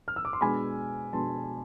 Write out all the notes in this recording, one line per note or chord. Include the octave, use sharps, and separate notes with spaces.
F6
E6
D6
C6
B2 G#3 B3 D4 G#5 B5
B2 G#3 B3 D4 A5 C6